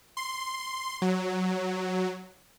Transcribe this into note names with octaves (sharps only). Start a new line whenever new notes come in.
C6
F#3